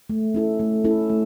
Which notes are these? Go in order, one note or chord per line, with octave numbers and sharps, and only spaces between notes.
A3
C#4 E4 A4
A3
C#4 E4 A4
A3